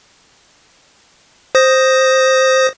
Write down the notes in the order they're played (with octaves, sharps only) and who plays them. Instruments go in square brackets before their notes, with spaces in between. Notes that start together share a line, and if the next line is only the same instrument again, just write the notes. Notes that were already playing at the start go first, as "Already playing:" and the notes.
[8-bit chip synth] C5 D#6 A#6